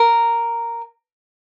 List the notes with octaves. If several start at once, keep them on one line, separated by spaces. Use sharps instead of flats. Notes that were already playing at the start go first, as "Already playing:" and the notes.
Already playing: A#4